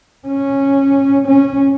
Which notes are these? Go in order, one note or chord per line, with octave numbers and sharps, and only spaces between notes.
C#4
C#4